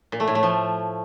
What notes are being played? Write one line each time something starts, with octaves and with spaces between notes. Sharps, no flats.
A#2
A3
A2
A3
F3